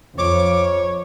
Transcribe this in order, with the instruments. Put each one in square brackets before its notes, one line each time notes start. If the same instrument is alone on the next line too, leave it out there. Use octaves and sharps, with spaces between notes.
[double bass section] F2 [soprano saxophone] C#5 [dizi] D6